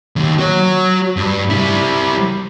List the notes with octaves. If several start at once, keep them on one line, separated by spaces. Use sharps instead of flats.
D#2
F#4 C#5
G2
G3 E4